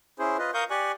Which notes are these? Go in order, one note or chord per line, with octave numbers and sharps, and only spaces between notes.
C#4 E4 G#4 C5
F4 B4 D#5
A#4 F5 C#6 D#6 G6
G4 D5 G#5 C#6 F#6